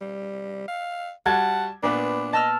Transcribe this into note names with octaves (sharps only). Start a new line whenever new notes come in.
G3
F5
G3 F#4 F#5 A5 G#6
A#2 B3 D4 B4
D#5 A5 E6 F6